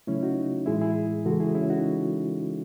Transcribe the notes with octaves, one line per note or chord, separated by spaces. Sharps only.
C#3 F#3 A3 C#4 E4
D#4 F#4
A2 E3 G#3 E4 G#4
E4 G#4
C#3 E3 G#3 F#4 A4
E4 G#4
C#4 E4
D#4 F#4